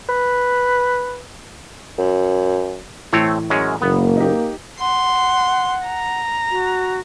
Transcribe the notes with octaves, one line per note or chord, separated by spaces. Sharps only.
B4
F#2
A2 E3 A3 C4 C#5
F#2 G#3 C#4
F#1 A#3 B3
D#4 G4
F#5 C6
A#5
F#4